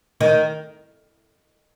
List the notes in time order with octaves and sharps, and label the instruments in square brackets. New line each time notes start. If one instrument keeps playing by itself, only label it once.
[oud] D#3